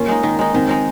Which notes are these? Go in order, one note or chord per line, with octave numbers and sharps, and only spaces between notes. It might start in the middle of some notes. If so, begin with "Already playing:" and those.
Already playing: A#3 C#4 F4
G#3 D#4
D#3
G#3 D#4
D#3 C4
G#3 D#4